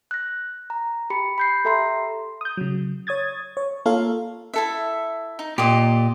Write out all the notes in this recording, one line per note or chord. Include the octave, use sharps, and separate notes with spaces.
F#6 A#6
A#5
G4 B5 C#7
B5 G6 C7
G4 A4 E5 A#5 C6 C7
D#6 G6
C#3 F#3
C#5 D#6 G#6 A6
C#5
A#3 F4 A4 A#4 C#5 F5
E4 A4 E5
D#4
A#2 G4 D#5